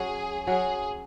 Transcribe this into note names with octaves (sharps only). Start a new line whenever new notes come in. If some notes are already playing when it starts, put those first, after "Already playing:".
Already playing: F#3 C#4 F#4 G#4 C#5
F#3 C#4 F#4 G#4 C#5